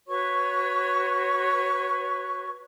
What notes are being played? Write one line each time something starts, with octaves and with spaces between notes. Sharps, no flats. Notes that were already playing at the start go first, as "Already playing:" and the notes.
F#4 B4 C#5 C#6